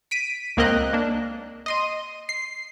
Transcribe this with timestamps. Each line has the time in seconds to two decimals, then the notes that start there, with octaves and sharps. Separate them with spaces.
0.11 B6 D7 D#7
0.57 C#2 A#3 C4 A#4 D#5 F#6
0.93 A#3 D4
1.66 D#5 C6 D#7
2.29 C7